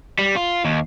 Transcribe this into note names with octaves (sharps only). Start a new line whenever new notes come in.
G3
F4
D#2